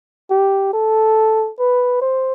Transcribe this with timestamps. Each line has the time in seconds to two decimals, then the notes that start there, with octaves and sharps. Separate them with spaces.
0.30 G4
0.73 A4
1.59 B4
2.02 C5